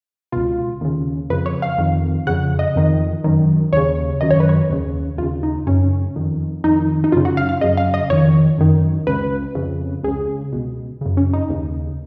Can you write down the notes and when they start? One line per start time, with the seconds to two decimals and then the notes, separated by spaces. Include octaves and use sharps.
0.32 C#2 B2 F4
0.81 D#2 C#3
1.30 F2 B4
1.33 C#3
1.46 C#5
1.62 F5
1.78 F2 D#3
2.27 C#3 F#5
2.30 F2
2.59 D#5
2.76 F2 D#3
3.24 F#2 D#3
3.73 D#2 C#3 C#5
4.21 F#2 D#3 D#5
4.31 C#5
4.40 B4
4.49 C#5
4.70 D#2 C#3
5.18 D#2 F4
5.23 C#3
5.43 D#4
5.67 F#2 C#3 C#4
6.16 F2 D#3
6.64 F2 D#3 D#4
7.04 D#4
7.12 F#2 C#3 F4
7.25 F#4
7.37 F5
7.49 F5
7.61 F#2 C#3 D#5
7.77 F5
7.94 D#5
8.10 F2 D#3 C#5
8.58 F#2 D#3
9.07 C#2 C#3 B4
9.55 F2 C#3
10.04 C#2 C#3 G#4
10.52 C#2 B2
11.01 F#2 C#3
11.17 C#4
11.33 D#4
11.50 D#2 C#3